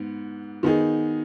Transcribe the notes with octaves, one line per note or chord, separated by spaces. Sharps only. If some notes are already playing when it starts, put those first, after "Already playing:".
Already playing: G#2 B3
D#3 B3 D#4 G#4